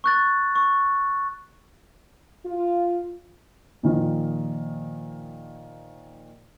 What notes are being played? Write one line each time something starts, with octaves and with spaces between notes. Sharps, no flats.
C#6 F#6 A6
C#6
F4
A#2 D#3 F3